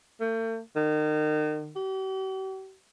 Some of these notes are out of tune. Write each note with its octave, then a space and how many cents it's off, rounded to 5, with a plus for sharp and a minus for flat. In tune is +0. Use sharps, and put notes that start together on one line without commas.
A3 +45
D#3 -35
G4 -45